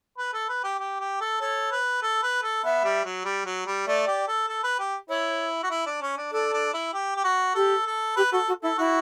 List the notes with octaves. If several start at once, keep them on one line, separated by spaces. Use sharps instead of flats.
B4
A4
B4
G4
G4
G4
A4
A4 C#5
B4
A4
B4
A4
B3 E5
G3
F#3
G3
F#3
G3
A3 D5
G4
A4
A4
B4
G4
E4 C#5
F#4
E4
D4
C#4
D4
D4 A4
D4
E4
G4
G4
F#4
G4 A4
A4
G4 B4
F#4 A4
F#4
E4 A4
E4 F#4